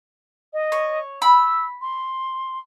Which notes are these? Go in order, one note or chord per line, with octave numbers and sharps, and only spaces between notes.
D#5
C#5
B5 E6
C6